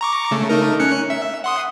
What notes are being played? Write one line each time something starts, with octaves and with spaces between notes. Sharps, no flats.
A#5 C#6 D6
C#3 A3
A3 D#4 A#4
C#4 F#6 C#7
E5
F#5 C6 D#6